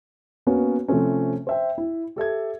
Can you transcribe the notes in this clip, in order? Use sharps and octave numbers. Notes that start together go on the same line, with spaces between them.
A#3 B3 C#4 F#4 B4 C#5
C3 F3 A3 C4 C#4
C5 E5 G5
E4
G4 A4 E5 G#6